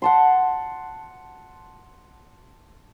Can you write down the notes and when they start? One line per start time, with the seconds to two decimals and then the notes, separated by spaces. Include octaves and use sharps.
0.02 F#5 A5 C6